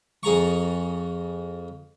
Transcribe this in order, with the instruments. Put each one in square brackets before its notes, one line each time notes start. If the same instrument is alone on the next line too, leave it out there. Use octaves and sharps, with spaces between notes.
[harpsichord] F2 G#4 A#5 C#6